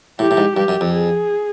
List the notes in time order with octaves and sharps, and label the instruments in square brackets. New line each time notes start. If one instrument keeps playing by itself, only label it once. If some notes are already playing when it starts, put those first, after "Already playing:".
[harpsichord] A2 [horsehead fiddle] G4
[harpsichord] A2
G#2
[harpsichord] G2 [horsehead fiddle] G4
[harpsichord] F#2
F2
[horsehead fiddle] G#4